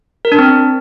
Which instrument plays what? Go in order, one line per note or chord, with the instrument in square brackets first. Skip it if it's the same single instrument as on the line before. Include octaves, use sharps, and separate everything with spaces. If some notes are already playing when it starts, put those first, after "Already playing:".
[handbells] A#4
D4
C4